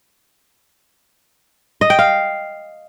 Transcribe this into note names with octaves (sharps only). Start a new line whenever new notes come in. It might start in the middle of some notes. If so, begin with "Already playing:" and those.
D#5
G5
F5